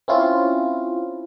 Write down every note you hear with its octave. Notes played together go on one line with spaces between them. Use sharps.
C4 C#4 E4 F4